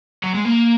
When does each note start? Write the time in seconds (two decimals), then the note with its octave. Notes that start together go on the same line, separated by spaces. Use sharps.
0.24 F#3
0.34 G#3
0.45 A#3